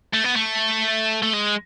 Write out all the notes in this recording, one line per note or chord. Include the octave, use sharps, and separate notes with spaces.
A3
B3
A3
A3
G#3